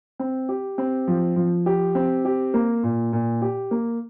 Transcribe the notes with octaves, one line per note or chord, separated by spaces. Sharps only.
C4
G4
C4
F3
F3
G4
C4
G4
A#3
A#2
A#2
G4
A#3